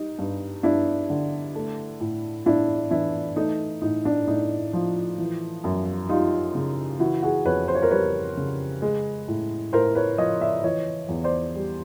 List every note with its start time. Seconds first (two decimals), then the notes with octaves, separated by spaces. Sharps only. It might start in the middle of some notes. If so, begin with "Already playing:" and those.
Already playing: G3 D#4
0.19 G2
0.63 G2 D4 E4
1.10 D3
1.55 A3
2.00 A2
2.45 A2 D4 E4
2.91 E3 D4 E4
3.36 A3 D#4
3.82 A2 D#4
4.05 D4
4.27 A2 D#4
4.73 F3
5.18 E3
5.64 F#2
6.09 G3 D#4 F4
6.55 C#3
7.00 E3 E4 F#4
7.22 F#4 G#4
7.45 F2 B4 C#5
7.68 C5
7.75 C#5
7.82 A#4 C5
7.91 G3 B4 C#5
8.37 C#3
8.82 G#3
9.28 A2
9.73 A2 A#4 C5
9.95 B4 C#5
10.18 F3 C#5 D#5
10.41 D5 E5
10.64 E3 C#5 D#5
11.09 E2
11.24 C5 D5
11.55 G3